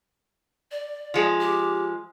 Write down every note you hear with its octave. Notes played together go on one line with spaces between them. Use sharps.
D5
F3 G#3
G4